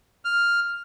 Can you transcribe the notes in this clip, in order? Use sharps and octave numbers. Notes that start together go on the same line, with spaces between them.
F6